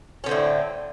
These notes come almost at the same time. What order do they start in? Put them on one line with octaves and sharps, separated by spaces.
C#4 D3 C4 A2